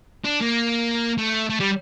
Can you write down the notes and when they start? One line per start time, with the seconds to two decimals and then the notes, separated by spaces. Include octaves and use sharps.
0.24 D4
0.41 A#3
1.18 A3
1.50 A3
1.60 G3